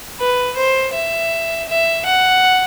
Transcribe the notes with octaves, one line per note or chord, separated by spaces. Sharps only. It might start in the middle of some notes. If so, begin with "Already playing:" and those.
B4
C5
E5
E5
F#5